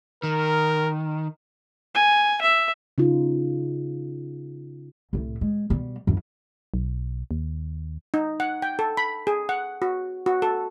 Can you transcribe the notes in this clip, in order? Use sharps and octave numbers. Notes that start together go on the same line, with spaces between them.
D#3 A#4
G#5
E5
C#3 D#4 F4
C2 A2
G#3
B2 G3
F#2 E3
B1
D#2
D#4
F#5
G5
A4
B5
G#4
F#5
F#4
F#4
A4